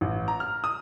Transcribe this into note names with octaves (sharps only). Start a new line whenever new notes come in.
A1
A#5
F6
D#6